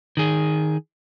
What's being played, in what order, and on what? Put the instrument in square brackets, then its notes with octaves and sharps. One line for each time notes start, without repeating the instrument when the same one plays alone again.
[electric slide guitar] D#3 G#4